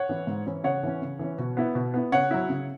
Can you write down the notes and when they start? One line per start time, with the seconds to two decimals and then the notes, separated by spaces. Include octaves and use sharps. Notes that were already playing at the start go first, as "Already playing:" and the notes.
Already playing: C#5 F#5
0.09 E3 C#4 E4
0.27 G#2
0.46 E3 C#4 E4
0.64 C#3 C#5 F#5
0.83 E3 C#4
1.02 C#3
1.19 E3 C#4
1.38 B2
1.57 B3 E4
1.75 B2
1.94 B3 E4
2.12 C#3 C#5 F#5
2.31 F#3 E4
2.49 C#3